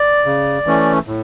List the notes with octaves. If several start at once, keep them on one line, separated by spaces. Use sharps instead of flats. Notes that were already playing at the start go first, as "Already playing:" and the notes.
Already playing: D5
C#3
E3 A3 C#4
A2